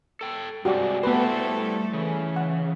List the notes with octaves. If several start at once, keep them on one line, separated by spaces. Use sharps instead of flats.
A4 G5
G2 C3 G#3 D4 F#4 G4 D5
G3 A3 B3 E4 G4 A4 B4 C5
C#3 E3
F#5